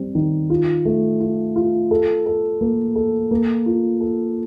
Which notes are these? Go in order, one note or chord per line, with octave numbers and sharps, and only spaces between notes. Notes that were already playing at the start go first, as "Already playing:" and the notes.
Already playing: G3 C4
D#3
F4
A3
F4
F4
A4
A4
A#3
A4
A#3
F4
A4